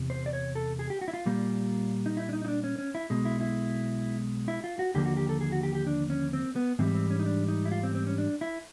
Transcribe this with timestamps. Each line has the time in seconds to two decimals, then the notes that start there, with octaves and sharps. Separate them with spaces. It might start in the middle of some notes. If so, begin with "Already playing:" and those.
Already playing: E2 C3
0.10 C5
0.26 D5
0.33 C#5
0.55 A4
0.79 G#4
0.90 G4
1.01 F#4
1.08 E4
1.14 F4
1.26 A#2 G3 A#3
2.06 D#4
2.17 E4
2.29 D4
2.33 D#4
2.45 D#4
2.48 D4
2.64 C#4
2.78 C#4
2.95 E4
3.10 B1 B2 G#3
3.25 E4
3.41 E4
4.48 E4
4.64 F4
4.79 F#4
4.94 D#2 D3 F3 A#3 G4
5.05 F#4
5.17 G4
5.29 A4
5.41 G#4
5.52 F#4
5.63 G4
5.75 G4
5.87 D4
6.10 C#4
6.33 C4
6.56 B3
6.79 G#2 E3 G3 C4
6.94 C4
7.10 C#4
7.19 D#4
7.26 D4
7.48 D#4
7.65 E4
7.72 F4
7.83 C4
7.95 C4
8.07 C#4
8.18 D4
8.41 E4